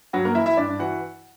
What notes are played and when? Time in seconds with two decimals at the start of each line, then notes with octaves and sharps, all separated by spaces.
0.13 G2 F#3 F#4
0.25 A#3 A#4
0.35 E3 E4 E5
0.46 E4 E5
0.57 G2 D4 D5
0.79 E3 F#4 F#5